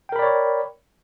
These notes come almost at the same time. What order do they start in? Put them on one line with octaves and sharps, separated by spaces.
G5 A#4 B5 D5 C#5